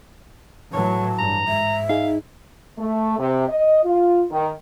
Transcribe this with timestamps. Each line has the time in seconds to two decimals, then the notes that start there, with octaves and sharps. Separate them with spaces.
0.73 A2 E3 F#3 C#5 A5
1.19 G2 A#5
1.48 G#2 E5
1.89 D#4 G#4 F5
2.78 A3
3.18 C3
3.49 D#5
3.84 F4
4.31 D#3